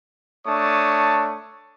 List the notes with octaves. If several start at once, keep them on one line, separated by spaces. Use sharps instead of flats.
A3 D4 C#5 A5 D#6